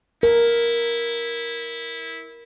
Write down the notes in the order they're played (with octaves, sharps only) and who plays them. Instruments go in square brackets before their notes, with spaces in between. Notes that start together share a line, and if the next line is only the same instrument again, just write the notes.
[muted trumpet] E4 [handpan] A#4